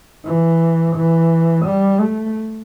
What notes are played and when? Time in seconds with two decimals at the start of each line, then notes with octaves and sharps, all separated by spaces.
0.24 E3
0.95 E3
1.65 G3
2.00 A3